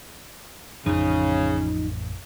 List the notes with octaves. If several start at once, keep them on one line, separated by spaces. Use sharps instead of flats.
A1 F2 C#3 F3 C#4 D#4